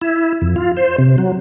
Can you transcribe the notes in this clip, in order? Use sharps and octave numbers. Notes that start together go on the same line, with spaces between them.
E4
F2
F4
C5
C3
F#3